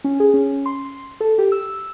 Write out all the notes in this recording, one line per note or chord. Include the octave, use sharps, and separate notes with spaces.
C#4
G#4
C#4
C6
A4
G4
E6